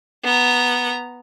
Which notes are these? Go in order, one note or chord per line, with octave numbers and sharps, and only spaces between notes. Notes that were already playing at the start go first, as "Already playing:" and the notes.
B3 A#5